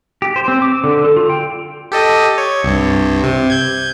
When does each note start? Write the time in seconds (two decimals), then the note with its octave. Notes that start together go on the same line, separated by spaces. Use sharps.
0.22 G4
0.36 C5
0.48 C4
0.62 D6
0.84 D3
1.04 A4
1.16 F4
1.30 G5
1.92 G4 A4 D#5
2.38 C#5
2.63 C2 G2
3.23 C3
3.50 G6 G#6